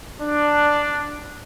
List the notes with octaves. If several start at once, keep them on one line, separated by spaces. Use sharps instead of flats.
D4